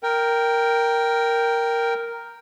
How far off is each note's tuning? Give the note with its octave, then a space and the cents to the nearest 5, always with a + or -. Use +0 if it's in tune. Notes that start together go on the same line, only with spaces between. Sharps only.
A#4 +0 G5 +0